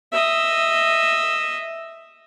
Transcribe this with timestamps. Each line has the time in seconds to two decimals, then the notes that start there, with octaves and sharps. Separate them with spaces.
0.12 D#5 E5